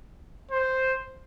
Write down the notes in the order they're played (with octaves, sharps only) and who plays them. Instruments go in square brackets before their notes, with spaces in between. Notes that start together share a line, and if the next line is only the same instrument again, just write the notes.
[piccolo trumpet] C5